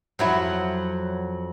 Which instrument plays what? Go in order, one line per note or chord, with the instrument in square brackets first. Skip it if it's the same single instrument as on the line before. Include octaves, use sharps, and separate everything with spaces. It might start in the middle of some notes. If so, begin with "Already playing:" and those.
[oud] F2 F#3 E4